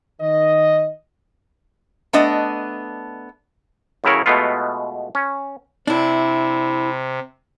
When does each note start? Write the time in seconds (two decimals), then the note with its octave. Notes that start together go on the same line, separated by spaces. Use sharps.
0.21 D#3 D#5
2.13 A3 B3 D4 D#5
4.04 F#2 A2 C#3 E4 A#4 C#5
4.26 B2 G#3 A3 B3 F4
5.15 C#4
5.87 C3 D4 E4